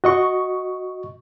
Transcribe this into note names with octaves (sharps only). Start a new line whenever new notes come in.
F#4 D#5 C#6